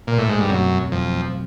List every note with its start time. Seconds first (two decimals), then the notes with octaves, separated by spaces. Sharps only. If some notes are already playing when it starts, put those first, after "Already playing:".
0.07 A#2
0.18 A2
0.29 G#2
0.40 G2
0.49 F#2 B2 F#3 A3 C4
0.92 F2 B2 F#3 A3 C4